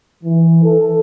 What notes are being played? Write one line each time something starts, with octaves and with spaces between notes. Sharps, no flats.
E3
A4